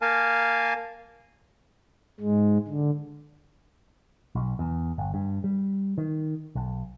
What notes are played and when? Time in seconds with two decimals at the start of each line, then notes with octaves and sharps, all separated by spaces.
0.02 A#3 A#4 F5 G#5 A5
2.20 G#2 G#3
2.68 D3
4.35 B1
4.59 E2
4.98 G1
5.14 G2
5.44 G3
5.98 D#3
6.55 B1